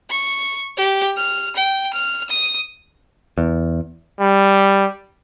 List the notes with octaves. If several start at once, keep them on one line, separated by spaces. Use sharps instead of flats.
C#6
G4
F6
G5
F6
D#6
E2
G3